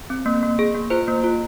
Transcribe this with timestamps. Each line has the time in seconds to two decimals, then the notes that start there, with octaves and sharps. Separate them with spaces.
0.10 C4
0.26 A#3
0.43 A#3
0.59 G#4
0.75 A#3
0.90 F4 C5
1.08 A#3
1.24 F4